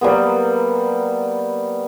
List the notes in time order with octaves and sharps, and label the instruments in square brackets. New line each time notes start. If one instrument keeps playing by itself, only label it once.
[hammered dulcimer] F#3 G3 A#3 B3